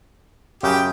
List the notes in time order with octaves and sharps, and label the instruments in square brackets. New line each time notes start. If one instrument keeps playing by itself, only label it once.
[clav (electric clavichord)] F#2 C#3 [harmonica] G4